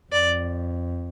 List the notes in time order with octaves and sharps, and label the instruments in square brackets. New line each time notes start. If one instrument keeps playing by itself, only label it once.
[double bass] F2 [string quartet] D5